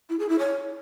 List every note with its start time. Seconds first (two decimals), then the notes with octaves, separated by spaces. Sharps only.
0.09 E4
0.19 G#4
0.29 E4
0.39 C#5